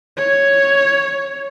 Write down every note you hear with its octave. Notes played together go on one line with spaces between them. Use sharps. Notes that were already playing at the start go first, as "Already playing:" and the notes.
C#5